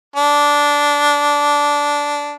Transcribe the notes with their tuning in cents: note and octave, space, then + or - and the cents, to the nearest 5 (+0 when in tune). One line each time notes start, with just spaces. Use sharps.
D4 -10